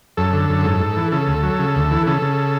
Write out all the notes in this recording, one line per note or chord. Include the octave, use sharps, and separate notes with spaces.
F#2 A4
D3
F#2
G#2
G#2
E3
C#3 A4
D2
F#3
C#3
D2
E3
C#3 A4
C#3